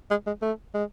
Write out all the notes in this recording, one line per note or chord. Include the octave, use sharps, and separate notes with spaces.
G#3
G#3
A3
G#3